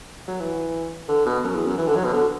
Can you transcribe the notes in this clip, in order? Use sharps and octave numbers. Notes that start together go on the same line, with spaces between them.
F#3
E3
D3
B2
F#2
E2
F#2
E3
D3
F#3
B2
D3